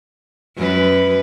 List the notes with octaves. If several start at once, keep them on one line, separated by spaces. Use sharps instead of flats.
F#2 B4